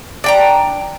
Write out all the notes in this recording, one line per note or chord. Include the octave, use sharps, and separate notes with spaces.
D4 G5 A#5